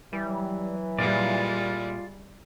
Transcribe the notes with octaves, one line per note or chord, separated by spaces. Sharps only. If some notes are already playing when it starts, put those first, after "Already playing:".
E3 F#3 G3
A#2 G3 G#3 E4 F4 D5